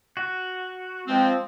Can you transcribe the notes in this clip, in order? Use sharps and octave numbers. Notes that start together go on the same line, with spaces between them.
F#4
F3 G#3 C4